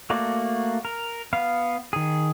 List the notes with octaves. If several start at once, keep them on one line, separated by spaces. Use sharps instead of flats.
A3 A#3 F#4 D5
A#4
B3 F5
D#3 G#4